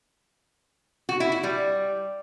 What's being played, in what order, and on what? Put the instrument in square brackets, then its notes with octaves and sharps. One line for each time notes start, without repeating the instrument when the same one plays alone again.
[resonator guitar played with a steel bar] F#4
E4
F#4
G3